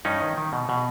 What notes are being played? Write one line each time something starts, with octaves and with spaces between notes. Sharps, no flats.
G2 C#4 D#4
D#3
D#3
B2
B2